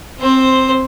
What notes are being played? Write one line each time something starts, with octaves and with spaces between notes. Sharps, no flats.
C4 C5